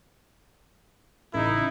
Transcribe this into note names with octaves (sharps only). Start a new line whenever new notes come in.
A1 C#3 D#4 E4 A#4